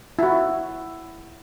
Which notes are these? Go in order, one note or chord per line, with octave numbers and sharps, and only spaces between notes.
E4 F#4